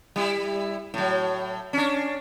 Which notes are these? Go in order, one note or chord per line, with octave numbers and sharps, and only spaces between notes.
G3 E4
A2 F#3
C#4 D4